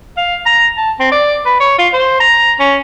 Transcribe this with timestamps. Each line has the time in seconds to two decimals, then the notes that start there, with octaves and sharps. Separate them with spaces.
0.17 F5
0.46 A#5
0.77 A5
1.00 C4
1.12 D5
1.46 B4
1.60 C#5
1.79 F4
1.94 C5
2.20 A#5
2.60 C#4